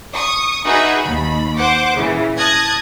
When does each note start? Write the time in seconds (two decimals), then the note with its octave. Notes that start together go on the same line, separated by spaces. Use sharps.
0.15 C#6 D#6
0.65 D#4 F#4 G#4 B4 D#5 E5
1.02 D#2 B5
1.57 C5 F#5 D6
1.96 A#2 C#3 E3
2.37 A5 D#6 F#6 G#6 A#6